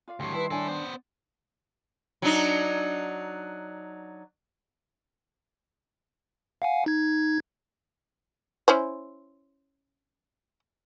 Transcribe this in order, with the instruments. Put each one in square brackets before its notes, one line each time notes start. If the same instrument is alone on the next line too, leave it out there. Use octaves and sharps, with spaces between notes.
[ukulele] F4 D5 F5
[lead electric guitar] D2 A2 [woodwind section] D#3 G3 C6 [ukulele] G4
[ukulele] D#4 G4 A5 [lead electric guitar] E4 [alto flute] B4
[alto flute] D4 [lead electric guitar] E4 A4 [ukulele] C#5 G#5
[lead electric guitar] B3 C5 [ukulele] D5
[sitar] F#3 D4 D#4
[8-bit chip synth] F5 F#5 G#5
D#4 G#6
[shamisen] C#4 E4 C5